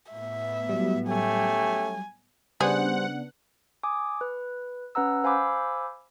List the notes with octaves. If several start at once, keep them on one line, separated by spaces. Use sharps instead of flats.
A2 B3 E5
F#3 G3
A3 C#4 G4 G#5
C#3 G3 B3 D4 G#4 C5 F#5
G#5 D6 D#6
B4
C#4 B4 F#5 A#5 E6
C5 F5 G#5 B5 D6 E6